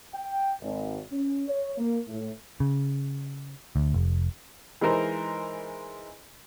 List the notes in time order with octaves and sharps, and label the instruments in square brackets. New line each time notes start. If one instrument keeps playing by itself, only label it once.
[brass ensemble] G5
G#1
C#4
C#5
A#3
A2
[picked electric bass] C#3
D2
F1
[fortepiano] E3 G#3 D#4 A#4 C5